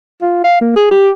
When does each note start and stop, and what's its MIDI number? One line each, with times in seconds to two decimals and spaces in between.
0.22 0.42 65
0.44 0.57 77
0.61 0.71 58
0.76 0.87 68
0.91 1.09 67